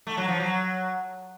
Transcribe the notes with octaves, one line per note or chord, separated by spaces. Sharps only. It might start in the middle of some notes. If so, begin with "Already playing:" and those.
A3
F#3
F3
F#3